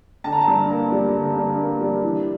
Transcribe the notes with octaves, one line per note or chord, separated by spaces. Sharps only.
D3 A5
A#5
A5
G2
A#3
G3
D3
G2
A#3
G3
E3